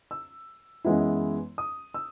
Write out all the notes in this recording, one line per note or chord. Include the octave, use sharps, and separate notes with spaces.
E6
F#2 E3 G#3 B3 E4
D#6
E6